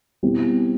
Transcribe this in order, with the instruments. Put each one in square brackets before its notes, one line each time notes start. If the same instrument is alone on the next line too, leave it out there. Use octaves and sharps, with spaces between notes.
[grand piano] B2 G3 C4 E4 G4